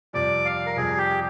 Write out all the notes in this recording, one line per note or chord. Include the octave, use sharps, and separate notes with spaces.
F2 C3 G3 D5
F5
A#4
F2 C3 G3 G#4
G4